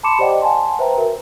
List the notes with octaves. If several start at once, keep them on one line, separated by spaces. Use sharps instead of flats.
A5 B5 C6 D6 C#7 E7
G4 C5 D5 D#5 F#5 G5
F#5 G#5 A5 C6
B4 C5 E5 G5 A#5
F#4 A#4 E5